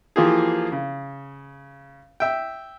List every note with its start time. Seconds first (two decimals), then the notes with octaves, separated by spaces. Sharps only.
0.16 E3 F3 A#3 F4 G4 G#4
0.72 C#3
2.20 E5 G5